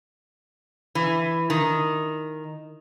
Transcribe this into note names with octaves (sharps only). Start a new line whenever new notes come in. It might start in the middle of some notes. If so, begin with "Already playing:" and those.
E3
D#3